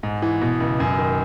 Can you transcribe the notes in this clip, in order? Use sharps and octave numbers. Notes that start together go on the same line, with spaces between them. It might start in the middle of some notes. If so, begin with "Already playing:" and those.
G#2
E3
B2
C#2
F#2
D#3